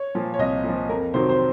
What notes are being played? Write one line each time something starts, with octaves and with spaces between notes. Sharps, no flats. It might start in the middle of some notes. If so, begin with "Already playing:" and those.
Already playing: C#5
A#2 F3
C#5
C2 D#5
A#2 F3
F2 A#4
C3 D#3 F#3 C5
C5